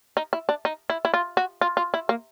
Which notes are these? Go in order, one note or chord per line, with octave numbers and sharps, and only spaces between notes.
D#4
E4
D4
D#4
E4
E4
F4
F#4
F4
F4
E4
A#3